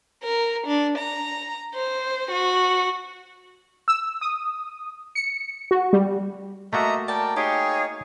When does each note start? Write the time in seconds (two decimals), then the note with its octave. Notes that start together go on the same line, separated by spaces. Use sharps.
0.24 A#4
0.67 D4
0.98 A#5
1.75 C5
2.32 F#4
3.88 E6
4.21 D#6
5.15 C#7
5.71 F#4
5.93 G3
6.73 A3 A#3 F#4 D#5 E5 A#5
7.08 A#4 D5 G5 A5
7.36 D#4 G4 G#4 C#5 F5